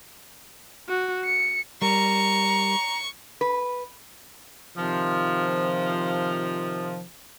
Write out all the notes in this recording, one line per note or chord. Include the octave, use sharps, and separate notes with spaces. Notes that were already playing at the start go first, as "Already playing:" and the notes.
F#4
C#7
G3 A#4 A#5 C#6
B4
C3 D#3 F3